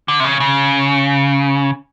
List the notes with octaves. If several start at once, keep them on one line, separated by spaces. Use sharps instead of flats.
D3
C3
C#3
C#3